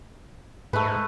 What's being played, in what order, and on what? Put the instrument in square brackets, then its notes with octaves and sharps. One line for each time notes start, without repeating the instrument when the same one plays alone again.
[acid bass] G#2 [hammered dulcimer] A3 B4